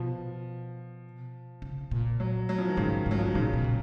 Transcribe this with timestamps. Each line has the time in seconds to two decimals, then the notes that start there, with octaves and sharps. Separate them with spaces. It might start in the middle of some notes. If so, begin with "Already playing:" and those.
Already playing: B2 F3
1.62 C#3
1.91 A#2
2.20 F#3
2.49 F#3
2.58 F3
2.68 D#3
2.77 G#2 C#3
3.06 G#2 F#3
3.19 F3
3.27 D#3
3.35 A#2 C#3
3.54 B2
3.64 A#2